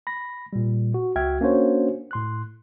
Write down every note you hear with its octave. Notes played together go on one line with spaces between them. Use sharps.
B5 A#6
A#2 G3
F#4
C#2 F#4 E5 G5 F6 G#6
A#3 C#4 D4 F#4 C5 C#5
A2 C6 F#6